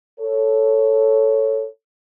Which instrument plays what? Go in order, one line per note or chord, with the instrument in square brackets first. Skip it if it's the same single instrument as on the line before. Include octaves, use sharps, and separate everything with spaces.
[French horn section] A4 C#5